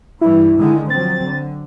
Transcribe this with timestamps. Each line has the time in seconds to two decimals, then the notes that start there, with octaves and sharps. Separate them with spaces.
0.21 G2 E3 E4
0.59 D3 D#3 G#3
0.90 F3 F#3 C4 A6
1.23 D3